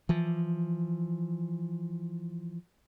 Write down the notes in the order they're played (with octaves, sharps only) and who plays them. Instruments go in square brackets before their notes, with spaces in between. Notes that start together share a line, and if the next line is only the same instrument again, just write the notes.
[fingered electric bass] E3 F3